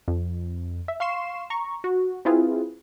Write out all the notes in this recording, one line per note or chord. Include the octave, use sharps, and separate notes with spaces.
F2
E5
F5 C6 C#6 C7 E7
A#5 C#6
F#4
C4 E4 F4 G#4 B4